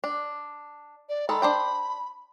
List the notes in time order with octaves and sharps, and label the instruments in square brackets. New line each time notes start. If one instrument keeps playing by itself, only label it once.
[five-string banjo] D4
[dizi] D5
[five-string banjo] D#3 G#3 A4 [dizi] B5
[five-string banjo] D4 C5 G5